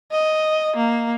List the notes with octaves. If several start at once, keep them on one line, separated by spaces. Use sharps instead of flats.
D#5
A#3